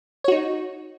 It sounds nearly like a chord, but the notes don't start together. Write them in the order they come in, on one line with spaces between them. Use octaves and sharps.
C#5 F#4 D#4